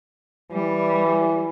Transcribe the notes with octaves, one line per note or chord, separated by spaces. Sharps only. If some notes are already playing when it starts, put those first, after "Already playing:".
E3 G3